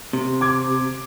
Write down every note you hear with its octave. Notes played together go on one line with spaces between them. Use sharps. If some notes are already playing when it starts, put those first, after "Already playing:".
C3
D6 G#6